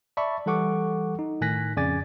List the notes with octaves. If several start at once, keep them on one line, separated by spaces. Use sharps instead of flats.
D5 E5 A5 B5 C#6
E3 G3 A4 F#5 C#6 D6
D#4
A2 D#3 G#5 F#6 A#6 B6
F2 C#3 D5 G#5 D6 A6